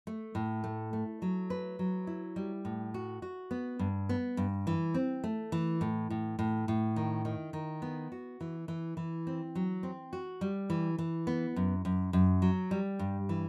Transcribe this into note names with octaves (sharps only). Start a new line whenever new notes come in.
A3
A2
A3
A3
F#3
B4
F#3
E4
G3
A2
F#4
F#4
B3
G2
B3
G2
E3
C4
A3
E3
A2
A2
A2
A2
D#3
D#3
D#3
B3
F#4
E3
E3
E3
C4
F#3
C4
F#4
G3
E3
E3
B3
F#2
F#2
F#2
F#3
G3
G2
E3